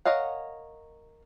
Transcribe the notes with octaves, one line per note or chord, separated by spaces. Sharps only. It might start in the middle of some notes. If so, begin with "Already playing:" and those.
A#4 C#5 D#5 F5 F#5